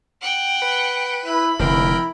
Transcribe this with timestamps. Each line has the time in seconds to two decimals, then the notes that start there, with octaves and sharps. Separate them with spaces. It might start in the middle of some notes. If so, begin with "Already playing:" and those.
0.21 F#5 G5
0.62 B4
1.25 E4 B5
1.59 F1 D3 E4 A#4 G5